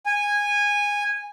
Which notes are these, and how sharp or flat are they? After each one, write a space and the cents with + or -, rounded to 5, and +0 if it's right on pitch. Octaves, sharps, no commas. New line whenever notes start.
G#5 -15